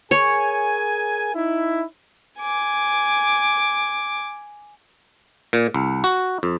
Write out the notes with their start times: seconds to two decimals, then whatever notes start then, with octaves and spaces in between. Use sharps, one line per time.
0.11 G#4 A#4 C#5 G#5
1.35 D#4 E4
2.39 G#5 D6
5.53 A#2
5.74 C2
6.04 F#4
6.43 F2